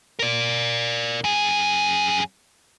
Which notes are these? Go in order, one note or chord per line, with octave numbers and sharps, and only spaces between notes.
A#4 D5
F#2 G#4